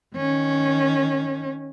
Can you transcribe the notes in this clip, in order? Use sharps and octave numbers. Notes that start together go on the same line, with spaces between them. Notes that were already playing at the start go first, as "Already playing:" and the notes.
D#3 C#4